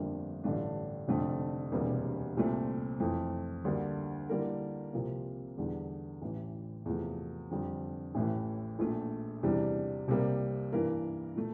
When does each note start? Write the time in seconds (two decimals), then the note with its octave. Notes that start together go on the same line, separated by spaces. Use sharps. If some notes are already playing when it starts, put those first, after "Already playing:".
Already playing: G1 F2 D3 G3 A#3
0.44 A1 G2 D3 A3 D4
1.07 F1 F2 D3 A3 D4
1.72 E1 D2 C3 G3 A#3
2.37 C2 A#2 A3 C4
3.00 F2 E3 A3
3.64 D2 D3 G3 A#3
4.29 D3 G3 A#3 E4 A#4
4.93 C2 C3 F3 A#3 F4
5.57 E2 D3 G3
6.22 A1 A2 E3
6.86 E2 C3 F3 A3
7.51 F2 D3 G3
8.15 A1 A2 E3 A3
8.79 A#1 A#2 A3
9.43 E2 C3 E3 G3 D4
10.07 C2 C3 G3 A#3
10.72 G2 E3 A#3 E4 A#4
11.36 A#2 A3